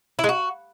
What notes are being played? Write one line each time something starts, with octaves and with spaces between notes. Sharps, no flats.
E4
G#3
F#4